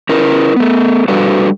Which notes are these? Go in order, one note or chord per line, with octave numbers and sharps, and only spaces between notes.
C#4 E4 A#4 B4
A3 B3
G3 D4 F#4 A4 B4 F5